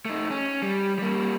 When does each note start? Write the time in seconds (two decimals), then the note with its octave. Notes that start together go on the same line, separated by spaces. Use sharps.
0.05 A3 D#4
0.31 C#4
0.63 G3
0.99 G3 A#3